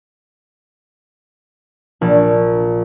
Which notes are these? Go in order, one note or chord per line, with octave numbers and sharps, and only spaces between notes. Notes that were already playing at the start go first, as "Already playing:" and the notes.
A#1